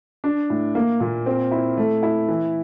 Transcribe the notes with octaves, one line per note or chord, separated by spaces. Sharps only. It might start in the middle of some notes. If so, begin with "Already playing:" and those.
D4
A2
A#3
A#2
C4
E4
A3
E4
E3